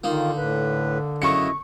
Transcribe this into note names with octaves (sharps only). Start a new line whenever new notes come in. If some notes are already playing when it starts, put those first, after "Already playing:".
D3 D#3 A#3 D#4 F4
A2 B4
F#2 C#3 E4 D#5 A5 C#6 C#7